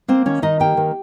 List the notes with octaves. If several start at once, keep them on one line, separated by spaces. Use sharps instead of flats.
A#3 C4 C5
D#3 C#4 C#5
D#3 D#4 D#5
A#3 G4 G5
D#3